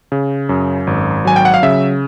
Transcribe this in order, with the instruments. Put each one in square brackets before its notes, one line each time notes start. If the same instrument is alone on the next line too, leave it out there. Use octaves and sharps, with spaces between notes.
[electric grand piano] C#3
F#2
G#1
F#3 G#5
G5
F#5
F5
C#3 E5